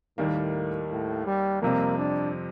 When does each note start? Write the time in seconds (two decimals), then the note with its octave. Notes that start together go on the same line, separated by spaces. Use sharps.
0.18 D#2 A2 D#3 G3 A#3
0.91 A2
1.27 G3
1.62 F2 C3 G3 A#3 C4
1.98 D4